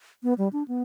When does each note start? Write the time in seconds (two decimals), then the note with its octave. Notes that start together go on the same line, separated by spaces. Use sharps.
0.23 B3
0.38 G3
0.53 D4
0.68 B3